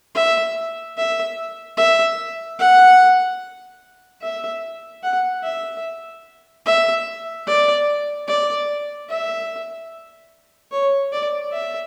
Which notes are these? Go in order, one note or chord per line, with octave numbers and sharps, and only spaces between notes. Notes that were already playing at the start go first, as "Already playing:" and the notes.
E5
E5
E5
F#5
E5
F#5
E5
E5
D5
D5
E5
C#5
D5
E5